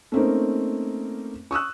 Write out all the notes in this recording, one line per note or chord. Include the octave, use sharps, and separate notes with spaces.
A3 A#3 C4 C#4 D#4 A#4
C#6 D#6 E6 F#6